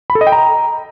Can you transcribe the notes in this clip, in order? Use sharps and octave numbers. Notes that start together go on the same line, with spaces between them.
B5
A4
D#5
G5
A#5